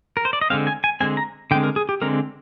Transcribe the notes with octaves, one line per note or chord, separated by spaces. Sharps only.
A#4
C5
D5
D#5
D3 G#3 C4 F5
G#5
G#5
D3 G#3 C4 G#5
A#5
D3 G#3 C4 G5
A#4
G#4
G4
D3 G#3 C4 A#4